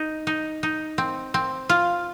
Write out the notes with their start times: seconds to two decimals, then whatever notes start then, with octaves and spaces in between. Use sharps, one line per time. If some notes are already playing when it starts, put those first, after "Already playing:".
Already playing: D#4
0.27 D#4
0.63 D#4
0.98 C4
1.34 C4
1.69 F4